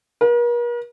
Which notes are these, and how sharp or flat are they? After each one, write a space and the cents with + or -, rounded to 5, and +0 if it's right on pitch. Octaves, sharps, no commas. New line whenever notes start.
A#4 +45